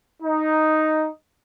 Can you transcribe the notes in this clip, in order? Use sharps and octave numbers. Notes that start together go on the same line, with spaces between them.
D#4